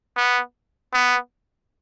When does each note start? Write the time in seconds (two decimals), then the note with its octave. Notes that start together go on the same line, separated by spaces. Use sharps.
0.17 B3
0.93 B3